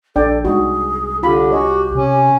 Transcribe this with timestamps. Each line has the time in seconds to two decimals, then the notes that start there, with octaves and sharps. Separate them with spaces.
0.16 A#1 D4 A4 D5 G5
0.45 C2 G#3 D#4 F#4 G#4
1.23 D3 F4 G4 F5 B5
1.51 F#4 C#5 D#5 G#5
1.95 C3 C#4